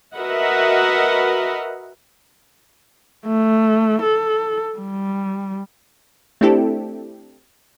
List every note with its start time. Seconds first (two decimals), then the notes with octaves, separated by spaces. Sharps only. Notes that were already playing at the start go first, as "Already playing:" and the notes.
0.16 F#4 A#4 B4 D#5 E5 F#5
3.26 A3
4.02 A4
4.78 G3
6.41 A3 C4 D4 E4 G4 A4